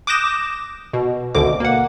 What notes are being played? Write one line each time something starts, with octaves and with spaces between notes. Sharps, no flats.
D6 D#6 F#6 G6 A#6 E7
B2
G#1 D2 B2 D3 D6
A#3 F#5